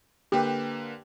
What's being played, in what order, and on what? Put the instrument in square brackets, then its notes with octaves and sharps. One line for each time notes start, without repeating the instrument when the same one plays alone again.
[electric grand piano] D3 A#3 B4 [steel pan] G4